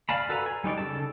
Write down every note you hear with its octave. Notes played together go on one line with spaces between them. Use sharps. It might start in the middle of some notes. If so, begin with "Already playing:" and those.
D5 F5 G#5 A5 B5
F#4 A4 B4 G#5 A#5
G#5
G3 D#4 C#5 D5
C#3 A4 A5